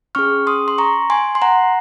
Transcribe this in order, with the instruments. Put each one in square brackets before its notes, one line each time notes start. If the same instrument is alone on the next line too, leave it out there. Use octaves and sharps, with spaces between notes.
[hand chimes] C#4 G#4 C#6 F6
C6 D#6
C6
A#5 C#6
G#5 C6
C6
F#5 A#5